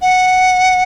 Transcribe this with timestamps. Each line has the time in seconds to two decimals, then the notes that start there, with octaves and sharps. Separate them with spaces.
0.02 F#5